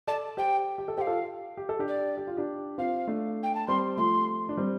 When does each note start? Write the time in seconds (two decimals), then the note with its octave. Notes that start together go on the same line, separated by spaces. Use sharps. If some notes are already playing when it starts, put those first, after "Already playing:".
0.07 A4 D5 A5
0.37 G4 C5 G5
0.78 G4
0.88 A4
0.97 G4 C5 F5 G5
1.07 F4 A4
1.57 G4
1.69 A4
1.79 D4 G4
1.87 D5
2.17 G4
2.27 F4
2.37 D4 G4
2.78 C4 F4 F5
3.07 A3 D4
3.43 G5
3.55 A5
3.68 G3 C4 C6
3.97 F3 A3 C6
4.49 D4
4.57 G3 C4